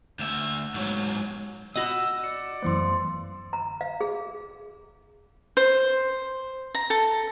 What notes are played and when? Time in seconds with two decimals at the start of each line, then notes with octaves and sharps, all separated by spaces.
0.19 D2 E5
0.74 G#2 F#3
1.76 F#4 D#5 E6
2.24 D5 C#7
2.62 F#2 E3 A3 B3 C5 C6
3.53 A#5
3.81 F5
4.01 G#4
5.57 C5
6.75 A#5
6.90 A4